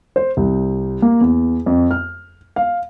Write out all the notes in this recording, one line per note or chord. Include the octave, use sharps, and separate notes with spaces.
C5
C2
A#3
E2
F2
F6
F5